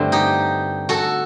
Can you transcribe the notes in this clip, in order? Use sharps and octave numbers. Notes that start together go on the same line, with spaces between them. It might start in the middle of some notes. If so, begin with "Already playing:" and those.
Already playing: G2 D3 A3 C4
D#4 G4
F#4 A4